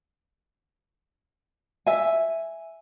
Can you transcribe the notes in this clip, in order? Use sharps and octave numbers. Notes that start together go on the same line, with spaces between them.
E5 G#5